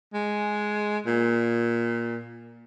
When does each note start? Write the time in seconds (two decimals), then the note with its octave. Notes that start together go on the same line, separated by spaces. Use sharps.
0.14 G#3
1.07 A#2